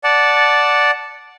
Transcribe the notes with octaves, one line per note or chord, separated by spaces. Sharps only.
D5 F#5 A5